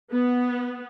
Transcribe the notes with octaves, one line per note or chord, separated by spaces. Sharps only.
B3